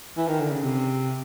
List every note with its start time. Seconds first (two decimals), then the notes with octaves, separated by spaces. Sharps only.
0.17 E3
0.28 D#3
0.40 D3
0.52 C#3
0.63 C3